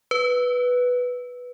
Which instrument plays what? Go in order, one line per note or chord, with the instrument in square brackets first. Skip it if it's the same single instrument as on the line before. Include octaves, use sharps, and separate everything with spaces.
[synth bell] B4